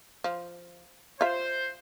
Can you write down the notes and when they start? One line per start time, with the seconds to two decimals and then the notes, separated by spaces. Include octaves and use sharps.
0.24 F3
1.21 F4 C5 E5